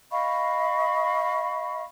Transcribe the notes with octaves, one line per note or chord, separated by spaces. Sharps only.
D#5 F5 B5 C#6